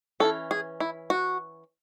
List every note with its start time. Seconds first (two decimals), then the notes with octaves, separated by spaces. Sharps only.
0.20 E3 G#3 C#4 A4
0.51 G#4
0.80 E4
1.10 F#4